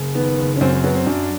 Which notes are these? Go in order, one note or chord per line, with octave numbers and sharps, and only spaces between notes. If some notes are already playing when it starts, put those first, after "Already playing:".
Already playing: F#1
D#3 B3
F#1
C#4
F#2 C4
C4
F#3 B3
C4
F#2 D4